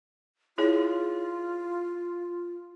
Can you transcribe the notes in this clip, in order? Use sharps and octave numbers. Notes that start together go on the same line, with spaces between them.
E4 F4 G#4 C#5